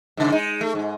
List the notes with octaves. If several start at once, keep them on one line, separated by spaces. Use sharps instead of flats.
G#2 C#3
G#3 D#4
A3
G#2 G#3